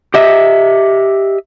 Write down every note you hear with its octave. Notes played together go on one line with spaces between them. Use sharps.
G4 D#5 E5